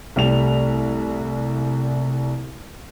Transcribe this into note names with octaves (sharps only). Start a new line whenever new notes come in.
C2 G3 A3 F7